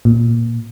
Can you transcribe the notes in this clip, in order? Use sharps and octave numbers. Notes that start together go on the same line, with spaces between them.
A#2